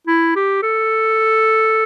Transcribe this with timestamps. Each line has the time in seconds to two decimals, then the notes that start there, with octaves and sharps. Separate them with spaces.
0.07 E4
0.36 G4
0.63 A4